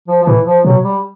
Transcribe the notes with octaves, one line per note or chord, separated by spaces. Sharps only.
F3
F3
A2 E3
F3
B2 F#3
G3